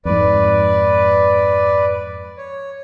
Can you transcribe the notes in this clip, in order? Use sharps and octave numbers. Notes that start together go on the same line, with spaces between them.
F2 G#2 B4 D5
C#5